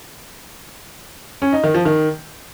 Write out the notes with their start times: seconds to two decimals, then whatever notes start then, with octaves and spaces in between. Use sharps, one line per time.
1.42 C#4
1.53 D#4
1.64 D#3
1.74 F3
1.85 D#3